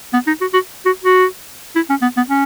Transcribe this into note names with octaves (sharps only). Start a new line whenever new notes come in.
B3
D#4
F#4
F#4
F#4
F#4
E4
C#4
B3
B3
C#4